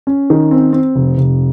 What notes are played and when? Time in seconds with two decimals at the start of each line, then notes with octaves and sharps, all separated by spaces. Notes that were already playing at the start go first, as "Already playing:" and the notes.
0.07 C#4
0.30 D#3
0.51 C4
0.73 C4
0.95 F1
1.17 F1